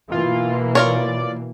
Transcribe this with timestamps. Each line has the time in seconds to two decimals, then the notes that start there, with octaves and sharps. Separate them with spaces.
0.12 B2 E3 A#3 F4
0.75 F4 A#4 C#5 D5